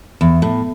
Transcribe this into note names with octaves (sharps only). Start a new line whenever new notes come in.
E2
A2